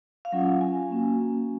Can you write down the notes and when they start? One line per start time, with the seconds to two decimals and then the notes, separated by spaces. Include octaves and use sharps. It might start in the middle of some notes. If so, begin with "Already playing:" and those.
0.25 F5
0.32 F#3 C#4 F4 F#5
0.61 G#5
0.90 F#3 A#3 C#4 F#4